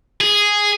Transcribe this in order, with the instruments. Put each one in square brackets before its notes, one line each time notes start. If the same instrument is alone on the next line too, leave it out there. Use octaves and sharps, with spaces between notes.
[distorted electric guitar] G#4